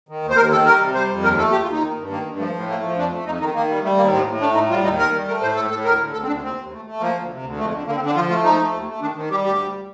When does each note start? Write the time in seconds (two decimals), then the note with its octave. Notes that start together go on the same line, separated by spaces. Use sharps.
0.09 D#3
0.22 D#2
0.30 C5
0.37 D#2 A#4
0.51 D#3 A4
0.65 G3 A#4
0.80 C3
0.95 G3 C5
1.10 F2
1.23 D#2 A#4
1.38 A3 A4
1.52 D#2 G4
1.62 F4
1.66 D#2
1.71 D#4
1.81 D#3
1.95 G2
2.10 D#3 A#3
2.25 G2
2.38 F3 A3
2.53 A2
2.67 A3 A#3
2.83 F3
2.96 F2 D4
3.10 A3
3.25 F2 D#4
3.40 D#3 D#4
3.54 D#3 A#3
3.68 G3
3.82 G3 A3
3.97 D#2 A#3
4.11 A2 C4
4.25 A2
4.40 A3 D4
4.54 A2 D#4
4.69 G3 F4
4.84 D#2 D#4
4.98 D#3 A#4
5.13 G3
5.28 A3 A#4
5.41 A2 C5
5.56 A2 A4
5.70 A2 A4
5.84 D2 A#4
5.99 D3
6.13 D2 A4
6.23 C4
6.27 D2 D4
6.42 D#2 C4
6.57 D#2
6.72 A3
6.85 A3
7.00 F3 A#3
7.14 D2
7.28 C3
7.43 D2
7.57 F2 A3
7.71 D3
7.86 D3 A#3
7.96 C4
8.00 D3
8.06 D4
8.14 F3 F4
8.29 A3 F4
8.43 F3 D#4
8.59 A3
8.73 D#2
8.86 A3
9.01 D#3 D4
9.15 D#3 C4
9.30 G3 G4
9.44 D2 G4
9.58 G3